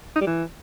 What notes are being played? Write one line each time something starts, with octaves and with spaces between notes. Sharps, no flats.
D#4
G3
E3